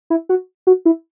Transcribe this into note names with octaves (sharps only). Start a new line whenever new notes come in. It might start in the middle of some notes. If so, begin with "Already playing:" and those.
E4
F#4
F#4
E4